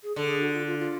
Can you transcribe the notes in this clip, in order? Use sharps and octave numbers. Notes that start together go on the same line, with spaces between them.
G#4
D3 A4
G#4
F#4
F4
F4
F4